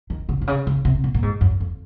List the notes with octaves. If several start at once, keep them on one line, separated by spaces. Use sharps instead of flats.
D#3
C#3
C3
C#3
C#3
C3
A#2
A#2
G#2
F#2
F2